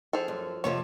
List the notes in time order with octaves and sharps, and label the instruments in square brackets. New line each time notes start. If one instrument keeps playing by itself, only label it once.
[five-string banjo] F3 G#4 A4
[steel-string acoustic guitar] F#2
[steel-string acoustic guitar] F2 C3 F3 [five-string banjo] C#5